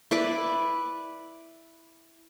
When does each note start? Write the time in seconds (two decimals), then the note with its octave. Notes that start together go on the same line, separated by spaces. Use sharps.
0.11 E4 B4 D5 D6